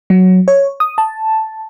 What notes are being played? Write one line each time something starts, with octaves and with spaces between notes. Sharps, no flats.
F#3
C#5
D#6
A5